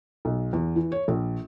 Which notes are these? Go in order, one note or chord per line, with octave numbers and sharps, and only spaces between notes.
B1
E2
E3
C#5
A#1